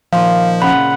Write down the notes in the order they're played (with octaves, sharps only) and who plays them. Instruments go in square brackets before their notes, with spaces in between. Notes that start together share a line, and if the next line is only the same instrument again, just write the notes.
[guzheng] A#2 D#3 F4 [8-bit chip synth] F3 [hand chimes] F5
[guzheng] C#3 A#4 [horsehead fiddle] F#5 [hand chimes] B5